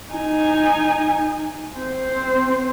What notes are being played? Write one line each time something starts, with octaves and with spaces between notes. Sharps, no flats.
D#4 G#5
C4 C5